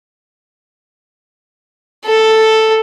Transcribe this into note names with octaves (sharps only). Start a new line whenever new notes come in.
A4